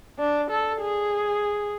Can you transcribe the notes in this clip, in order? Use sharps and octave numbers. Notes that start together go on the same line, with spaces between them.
D4
A4
G#4